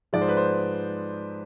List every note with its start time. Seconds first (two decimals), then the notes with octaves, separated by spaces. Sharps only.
0.13 G#2 F3 G#3 D5
0.21 C5
0.29 B4
0.37 C5